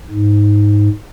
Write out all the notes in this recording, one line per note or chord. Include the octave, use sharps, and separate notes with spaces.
G#2